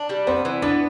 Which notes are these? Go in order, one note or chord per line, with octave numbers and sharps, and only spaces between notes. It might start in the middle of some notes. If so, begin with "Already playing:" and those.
Already playing: D4
G3
B3 C4
E3
B3 D4